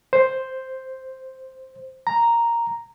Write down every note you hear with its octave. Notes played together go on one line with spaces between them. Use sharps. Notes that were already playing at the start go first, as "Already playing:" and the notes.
C5
A#5